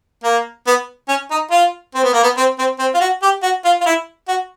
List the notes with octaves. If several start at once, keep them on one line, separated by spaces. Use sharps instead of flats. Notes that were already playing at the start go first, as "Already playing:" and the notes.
A#3
B3
C#4
D#4
F4
C4
B3
A#3
B3
C4
C4
C4
F4
F#4
G4
F#4
F4
F4
E4
F#4